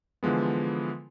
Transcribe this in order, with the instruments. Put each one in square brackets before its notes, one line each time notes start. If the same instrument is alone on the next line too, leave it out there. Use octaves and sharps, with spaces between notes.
[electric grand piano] D3 E3 F3 G#3 B3